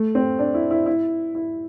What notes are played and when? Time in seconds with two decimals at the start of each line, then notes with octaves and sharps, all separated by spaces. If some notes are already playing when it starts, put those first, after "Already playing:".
Already playing: A3
0.15 C4
0.39 D4
0.54 E4
0.71 E4
0.86 E4
1.35 E4